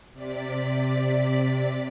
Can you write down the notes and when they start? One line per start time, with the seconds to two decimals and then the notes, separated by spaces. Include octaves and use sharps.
0.14 C3 D5 B6